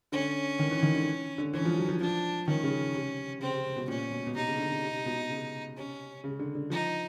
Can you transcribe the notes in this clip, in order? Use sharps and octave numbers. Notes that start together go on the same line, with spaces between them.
D3 C#4
D#3
E3
D#3
D3
D3
E3 C#4
F3
F#3
F3
F3 D4
D#3 C#4
C#3
C3
C#3 C4
C3
C3
B2
A#2 C#4
B2
B2
C3 D#4
C#3
D3
C#3
C3
C3
B2
C3
C#3
C3 C#4
C#3
D3
D3
F3 D#4